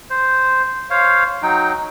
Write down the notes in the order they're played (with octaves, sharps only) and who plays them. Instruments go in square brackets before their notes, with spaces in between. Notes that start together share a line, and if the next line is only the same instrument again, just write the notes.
[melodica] C5
C5 C#5 F5
F#3 D#4 G5